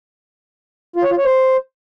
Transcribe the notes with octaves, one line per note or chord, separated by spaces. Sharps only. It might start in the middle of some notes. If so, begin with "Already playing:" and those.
F4
C#5
F4
C#5
C5